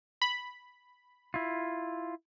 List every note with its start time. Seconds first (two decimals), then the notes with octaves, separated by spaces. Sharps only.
0.22 B5
1.34 E4 F4